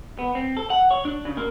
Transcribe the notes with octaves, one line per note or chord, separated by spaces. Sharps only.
B3
C4
A4
F#5
C#5
D4
C#3
A#3